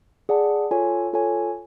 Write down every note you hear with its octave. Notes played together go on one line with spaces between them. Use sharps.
G#4 D5 F#5 A5
F4 A4 C#5 G#5
F4 A4 C#5 G#5